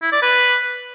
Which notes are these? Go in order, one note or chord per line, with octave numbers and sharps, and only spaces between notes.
E4
D5
B4